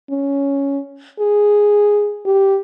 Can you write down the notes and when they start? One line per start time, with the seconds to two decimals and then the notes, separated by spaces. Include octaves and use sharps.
0.10 C#4
1.19 G#4
2.26 G4